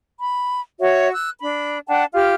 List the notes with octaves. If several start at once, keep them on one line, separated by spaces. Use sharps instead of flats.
B5
F#4 C#5 E5
E6 F#6
D4 B5
D4 F#5 G5 A5
F4 G4 F6